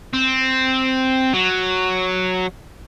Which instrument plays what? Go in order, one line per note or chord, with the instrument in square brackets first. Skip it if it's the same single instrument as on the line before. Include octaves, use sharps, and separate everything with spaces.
[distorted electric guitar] C4
F#3